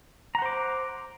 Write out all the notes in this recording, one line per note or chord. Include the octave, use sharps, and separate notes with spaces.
C5 F#5 A#5 D6